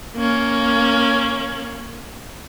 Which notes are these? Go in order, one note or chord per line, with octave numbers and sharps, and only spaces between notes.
A#3 C#4